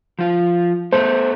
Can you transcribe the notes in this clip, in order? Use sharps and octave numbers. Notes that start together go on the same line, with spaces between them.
F3 F4
A3 B3 A4 C5